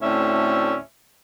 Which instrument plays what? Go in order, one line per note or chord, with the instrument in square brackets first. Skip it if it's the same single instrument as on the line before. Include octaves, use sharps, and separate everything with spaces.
[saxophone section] D2 A2 C4 C#4 D5 E5